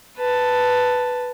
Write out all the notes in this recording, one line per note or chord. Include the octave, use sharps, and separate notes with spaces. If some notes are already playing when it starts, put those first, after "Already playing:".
B4 A5